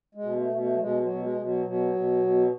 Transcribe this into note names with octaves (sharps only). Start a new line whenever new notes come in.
G#3
B2
A3
B2
A3
F#3
B2 G#3
F#3
B2
G#3
B2
F#3
B2 F#3
B2
B2